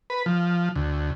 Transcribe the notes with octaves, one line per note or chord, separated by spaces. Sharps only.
B4
F3
D2